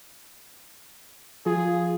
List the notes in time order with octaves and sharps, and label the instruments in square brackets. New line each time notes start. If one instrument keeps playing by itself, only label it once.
[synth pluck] F3 F4 [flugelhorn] G#4